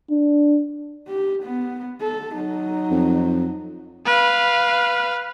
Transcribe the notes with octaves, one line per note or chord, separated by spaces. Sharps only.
D4
G4
B3
A4
F#3 D#4
F2
B4 F5